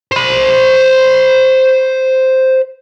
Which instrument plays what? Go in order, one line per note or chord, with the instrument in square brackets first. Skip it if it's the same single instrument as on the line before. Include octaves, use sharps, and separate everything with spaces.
[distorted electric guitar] C5 B5